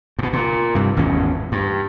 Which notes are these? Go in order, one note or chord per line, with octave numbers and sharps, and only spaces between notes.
G2 B2
A#2
G2 C3
G#1 E2 A2 C#4
G2